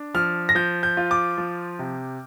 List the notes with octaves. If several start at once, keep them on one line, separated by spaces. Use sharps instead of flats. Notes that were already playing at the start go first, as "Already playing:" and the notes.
Already playing: D4
F3 F6
A#6
F3 G6
G6
F4
D6
F3
C3